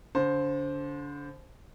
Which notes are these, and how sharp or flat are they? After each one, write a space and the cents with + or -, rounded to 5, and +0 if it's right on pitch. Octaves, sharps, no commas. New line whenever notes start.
D3 -30 C5 +5